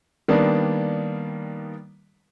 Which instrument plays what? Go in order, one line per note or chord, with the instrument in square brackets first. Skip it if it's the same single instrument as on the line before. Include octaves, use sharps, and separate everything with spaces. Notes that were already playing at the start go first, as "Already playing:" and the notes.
[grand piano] D#3 G3 A#3 B3 D4